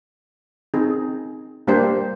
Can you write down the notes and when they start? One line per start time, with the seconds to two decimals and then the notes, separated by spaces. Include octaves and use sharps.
0.74 C4 D#4 G#4
1.67 G3 A#3 D4 G4 C5